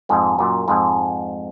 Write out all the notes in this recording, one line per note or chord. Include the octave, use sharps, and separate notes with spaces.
F2 G#2
F#2 A#2
F2 G#2